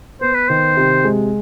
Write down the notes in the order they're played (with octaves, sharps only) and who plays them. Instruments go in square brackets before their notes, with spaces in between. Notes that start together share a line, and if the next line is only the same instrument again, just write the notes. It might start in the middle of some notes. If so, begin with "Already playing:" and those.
[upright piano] B3 [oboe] C5
[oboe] B4
[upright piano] D#3 [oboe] C5
[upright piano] C3
G#3